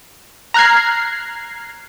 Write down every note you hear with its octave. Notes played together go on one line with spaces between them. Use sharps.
A#5 F6 F#6 G#6 C7